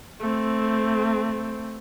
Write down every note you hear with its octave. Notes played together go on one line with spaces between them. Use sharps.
A3 C4